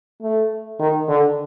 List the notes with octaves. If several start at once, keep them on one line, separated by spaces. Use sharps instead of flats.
A3
D#3
D3